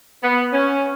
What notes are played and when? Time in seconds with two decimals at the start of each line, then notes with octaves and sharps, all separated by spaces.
0.23 B3
0.53 C#4